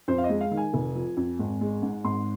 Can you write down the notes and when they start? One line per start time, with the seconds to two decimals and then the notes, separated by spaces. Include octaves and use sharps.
0.08 F2 C5
0.18 F5
0.24 D#5
0.29 G#3
0.41 F5
0.51 D#3
0.57 G#5
0.74 F1
0.95 F3
1.17 F2
1.39 G#1
1.61 G#3
1.83 G#2
2.04 G#1 C6